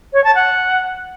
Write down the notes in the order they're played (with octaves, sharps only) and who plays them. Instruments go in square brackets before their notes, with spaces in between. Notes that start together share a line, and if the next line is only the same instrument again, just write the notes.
[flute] C#5
A5
F#5